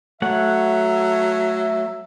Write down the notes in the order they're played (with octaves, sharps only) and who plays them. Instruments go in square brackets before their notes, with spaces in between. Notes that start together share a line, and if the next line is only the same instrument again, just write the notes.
[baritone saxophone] F#3 [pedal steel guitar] A3 C#5 F#5 [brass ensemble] E5